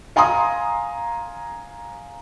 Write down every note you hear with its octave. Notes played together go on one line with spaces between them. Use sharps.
F5 G#5 A#5 C6 D#6